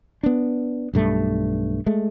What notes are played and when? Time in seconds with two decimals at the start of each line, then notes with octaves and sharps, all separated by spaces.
0.23 B3 D4
0.94 B1 G2 A3
1.86 G#3 A3